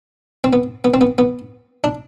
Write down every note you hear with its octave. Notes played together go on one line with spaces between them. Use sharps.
C4
B3
B3
C4
B3
B3
D4